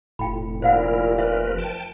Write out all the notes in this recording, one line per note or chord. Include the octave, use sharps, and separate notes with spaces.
F1 A2 F4 G5 B5
A#2 E4 A#4 C5 F5 F#5
F3 A#4 B4 E5
G5 A5